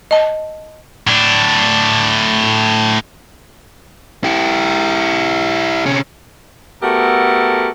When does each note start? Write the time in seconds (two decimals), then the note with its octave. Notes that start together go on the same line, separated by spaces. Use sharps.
0.11 D#5 A5
1.07 A2 D4
4.24 E4 G4
5.86 C3 C#4
6.83 A3 B3 F#4 G4 A4 A#4